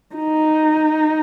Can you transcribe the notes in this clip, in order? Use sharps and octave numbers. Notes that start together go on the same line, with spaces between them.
D#4